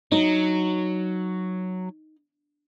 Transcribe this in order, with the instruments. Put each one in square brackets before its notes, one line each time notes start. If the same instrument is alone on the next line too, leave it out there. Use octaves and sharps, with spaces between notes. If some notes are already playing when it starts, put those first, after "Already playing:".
[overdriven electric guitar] F#3 [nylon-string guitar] D#4